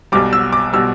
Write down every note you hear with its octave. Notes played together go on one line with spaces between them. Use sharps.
B1 B2 G3 D6
E6
D6
B2 G3 E6